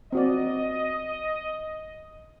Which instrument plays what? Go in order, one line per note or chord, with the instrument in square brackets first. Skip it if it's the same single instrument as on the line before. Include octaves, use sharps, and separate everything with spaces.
[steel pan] C4 F#4 D5 [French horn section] D#5